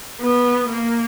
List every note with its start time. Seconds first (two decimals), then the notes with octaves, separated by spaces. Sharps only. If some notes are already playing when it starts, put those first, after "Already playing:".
0.21 B3
0.69 A#3